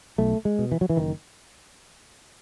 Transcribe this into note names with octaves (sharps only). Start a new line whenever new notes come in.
B1 A3
G#3
B2
E3
F#3
E3
F#1 D#3